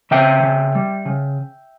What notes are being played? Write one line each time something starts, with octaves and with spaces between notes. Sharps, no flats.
C#3 E5 G5
C#3
G3
C#3